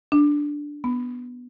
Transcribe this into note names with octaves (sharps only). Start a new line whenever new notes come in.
D4
B3